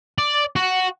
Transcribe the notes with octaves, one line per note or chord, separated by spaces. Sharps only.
D5
F#4